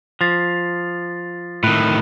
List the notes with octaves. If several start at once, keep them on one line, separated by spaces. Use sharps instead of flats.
F3 A6 C7
A2 D#3 B5 F#6